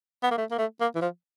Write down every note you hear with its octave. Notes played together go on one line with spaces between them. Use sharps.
B3
A#3
A3
A#3
A3
A#3
E3
F3